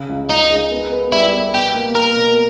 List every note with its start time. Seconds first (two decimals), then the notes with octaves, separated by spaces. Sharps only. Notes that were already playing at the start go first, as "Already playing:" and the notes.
Already playing: C#3
0.09 C#2
0.29 C#2 D#4
0.50 G#3
0.71 B3
0.92 B3
1.12 G3 E4
1.33 B3
1.54 B2 G4
1.74 A#3
1.95 A#3 A#4
2.16 B2